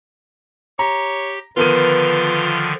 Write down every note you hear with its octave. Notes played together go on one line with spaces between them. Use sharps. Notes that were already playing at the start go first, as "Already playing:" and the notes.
G4 C#5 A#5
D3 D#3 F3 B3 F4 A#4 B4 D#7